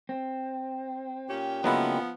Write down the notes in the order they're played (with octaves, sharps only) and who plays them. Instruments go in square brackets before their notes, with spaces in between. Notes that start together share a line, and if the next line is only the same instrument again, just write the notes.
[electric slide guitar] C4
[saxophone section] A#2 C#4 G4 [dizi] G5
[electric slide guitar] C#3 A#3 D4 [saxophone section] F3 B3 [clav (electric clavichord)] F#3 G#3 E4